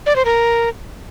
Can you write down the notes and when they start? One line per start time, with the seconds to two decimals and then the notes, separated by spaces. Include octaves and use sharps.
0.06 D5
0.16 C5
0.25 A#4